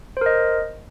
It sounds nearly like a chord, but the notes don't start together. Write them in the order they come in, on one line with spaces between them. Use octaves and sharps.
C5 A#4 D#5